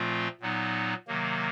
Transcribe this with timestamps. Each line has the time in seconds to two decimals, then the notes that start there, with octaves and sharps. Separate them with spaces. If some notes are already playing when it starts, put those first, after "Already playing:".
Already playing: A#2 F3 A3 C4 F4
0.40 A#2 F#3 B3 D#4
1.08 C3 D#3 F#3 A#3